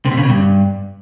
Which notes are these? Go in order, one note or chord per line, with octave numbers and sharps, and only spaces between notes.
C3
B2
C#3
B2
G2